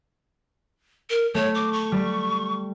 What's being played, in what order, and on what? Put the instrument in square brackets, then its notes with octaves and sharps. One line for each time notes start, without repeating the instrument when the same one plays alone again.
[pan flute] A#4
[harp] A3 [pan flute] C#5
[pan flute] D6
C#6
[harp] G3